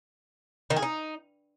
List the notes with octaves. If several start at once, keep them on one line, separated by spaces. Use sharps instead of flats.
D#3
G#4
D#4